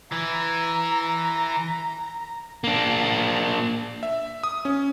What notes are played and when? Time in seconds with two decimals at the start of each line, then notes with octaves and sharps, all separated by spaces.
0.12 E3 A#5
2.64 A#3 D4
4.03 E5
4.44 D#6
4.65 C#4